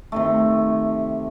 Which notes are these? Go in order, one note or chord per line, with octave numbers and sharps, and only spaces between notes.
C3 D#3 A3